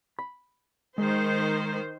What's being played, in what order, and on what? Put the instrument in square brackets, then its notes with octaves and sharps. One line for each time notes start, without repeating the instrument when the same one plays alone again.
[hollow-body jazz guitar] B5
[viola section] D#3 C5 [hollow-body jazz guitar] G#3